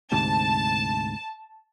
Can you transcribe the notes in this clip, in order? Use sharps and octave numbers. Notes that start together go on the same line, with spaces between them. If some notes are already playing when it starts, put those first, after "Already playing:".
D2 G#2 C3 A5